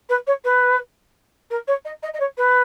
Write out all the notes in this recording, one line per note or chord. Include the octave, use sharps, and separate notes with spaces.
B4
C#5
B4
A#4
C#5
D#5
D#5
D#5
C#5
B4